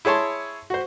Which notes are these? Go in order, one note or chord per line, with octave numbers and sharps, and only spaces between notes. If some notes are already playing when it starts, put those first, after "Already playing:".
E4 G#4 C#5 A5 C6
F#4 C5